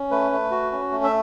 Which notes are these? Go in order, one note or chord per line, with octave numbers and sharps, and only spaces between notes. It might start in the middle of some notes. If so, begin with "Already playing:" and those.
Already playing: C#4
A3 B4
A3
F#4
C#4
A3
E5